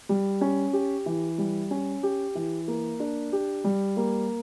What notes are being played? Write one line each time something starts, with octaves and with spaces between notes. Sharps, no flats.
G3
C#4
G4
E3
G3
C#4
G4
E3
A#3
D4
G4
G3
A#3